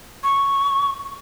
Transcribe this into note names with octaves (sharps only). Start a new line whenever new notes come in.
C#6